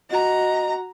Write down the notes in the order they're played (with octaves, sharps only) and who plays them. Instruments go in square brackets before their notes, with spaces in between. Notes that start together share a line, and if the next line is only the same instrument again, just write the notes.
[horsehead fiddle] F#4 [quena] D#5 [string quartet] A#5